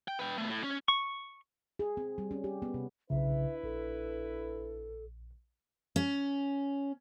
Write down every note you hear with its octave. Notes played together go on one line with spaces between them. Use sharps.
G5
B4 G5
A3 B3
A2
C#4
C#6
G#4
C4
G3
C#4
G4
B3
C3
B1 C#3 D4 E4 B4 E5
A#1 A4
C#4